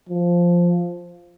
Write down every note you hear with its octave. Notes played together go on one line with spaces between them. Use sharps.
F3